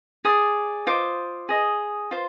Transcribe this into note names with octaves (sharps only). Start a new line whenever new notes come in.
G#4 D5 D#6
F4 C5 D#5 D6
G#4 D#5
F4 C5